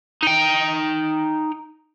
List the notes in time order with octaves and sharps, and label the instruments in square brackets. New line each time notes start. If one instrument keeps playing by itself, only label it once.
[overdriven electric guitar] D#4 G5